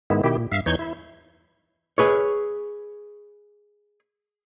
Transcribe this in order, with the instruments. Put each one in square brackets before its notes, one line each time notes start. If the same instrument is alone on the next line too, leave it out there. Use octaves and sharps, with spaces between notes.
[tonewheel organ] G#2 D#3 G#3 B3 E4
B2 D#3 E4 G4
A#2
G2 E5 F5
E2 E3 D#4 C#5 G6 G#6
E4
[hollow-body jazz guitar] G#4 B4 C#5